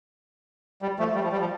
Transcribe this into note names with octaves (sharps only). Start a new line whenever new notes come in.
G3
F3 A3
G3
F3
G3
F3